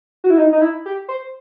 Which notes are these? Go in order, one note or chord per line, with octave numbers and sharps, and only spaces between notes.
F#4
E4
D#4
D#4
E4
G4
C5